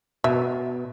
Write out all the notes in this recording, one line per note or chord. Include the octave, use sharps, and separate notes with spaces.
B2 E5